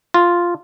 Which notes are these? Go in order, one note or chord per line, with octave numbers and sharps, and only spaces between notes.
F4